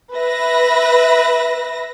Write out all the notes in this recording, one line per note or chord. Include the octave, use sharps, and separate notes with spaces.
B4 E5 A#6